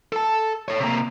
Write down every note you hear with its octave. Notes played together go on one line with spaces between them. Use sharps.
A4 A5
A4 C#5
C3 A#3